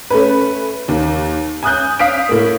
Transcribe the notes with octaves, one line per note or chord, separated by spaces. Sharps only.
A3 C#4 B4
D#2
G#5 D#6 F#6 G6
F5 D#6 B6 D7
A2 A#3